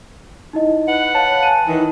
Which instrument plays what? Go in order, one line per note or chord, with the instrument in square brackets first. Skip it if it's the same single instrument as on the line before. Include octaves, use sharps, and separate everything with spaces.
[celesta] D#4 E4 D#5
[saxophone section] B4 F#5
[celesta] C#5 F5 [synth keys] A5
[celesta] G#5 F#6 D#7
[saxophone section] D#3 E3